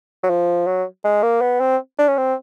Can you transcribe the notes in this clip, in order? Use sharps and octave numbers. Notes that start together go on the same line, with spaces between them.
F#3
F3
F#3
G#3
A#3
B3
C4
D4
C#4
C4